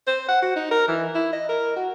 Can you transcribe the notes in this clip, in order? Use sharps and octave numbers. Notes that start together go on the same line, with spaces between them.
C5
F#5
F#4
D#4
A#4
E3
E4
D#5
A#4
F#4